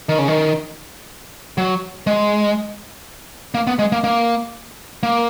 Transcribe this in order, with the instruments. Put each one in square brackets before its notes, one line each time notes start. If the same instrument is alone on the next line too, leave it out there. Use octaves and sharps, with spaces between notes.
[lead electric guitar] D#3
C#3
D#3
F#3
G#3
A#3
B3
G#3
A#3
A#3
A#3